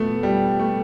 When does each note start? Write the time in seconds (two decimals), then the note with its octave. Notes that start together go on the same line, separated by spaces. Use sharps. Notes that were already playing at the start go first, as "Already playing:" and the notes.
Already playing: B2 A3 B3
0.23 G3
0.60 A3